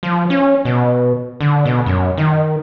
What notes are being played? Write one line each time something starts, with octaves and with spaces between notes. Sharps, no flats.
F3
C#4
B2
D3
B2
F#2
D#3